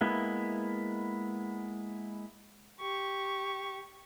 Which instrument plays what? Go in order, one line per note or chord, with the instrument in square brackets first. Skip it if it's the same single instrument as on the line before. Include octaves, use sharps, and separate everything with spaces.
[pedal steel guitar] G#3 A#3 B3 E4
[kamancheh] G4 C#6